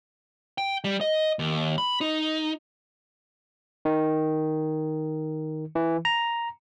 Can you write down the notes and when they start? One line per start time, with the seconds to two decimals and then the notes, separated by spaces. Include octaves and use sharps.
0.58 G5
0.84 G3
1.01 D#5
1.39 D#2
1.78 B5
2.01 D#4
3.85 D#3
5.75 E3
6.05 A#5